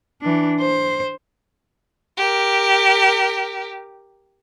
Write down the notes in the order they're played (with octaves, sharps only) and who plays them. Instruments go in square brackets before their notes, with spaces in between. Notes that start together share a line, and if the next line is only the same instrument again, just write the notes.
[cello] E3 D4
C5
[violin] G4 A#4